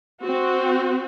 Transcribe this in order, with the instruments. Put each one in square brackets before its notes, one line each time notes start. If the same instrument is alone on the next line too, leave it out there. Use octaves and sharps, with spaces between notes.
[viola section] C4 F#4